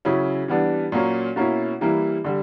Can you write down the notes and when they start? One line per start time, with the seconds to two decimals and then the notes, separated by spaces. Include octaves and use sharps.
0.05 C#3 F#3 C#4 E4
0.48 E3 G3 B3 D4
0.92 A#2 F#3 A#3 C#4
1.36 B2 A#3 C#4 E4
1.81 E3 G3 A#3 E4
2.24 D3 G3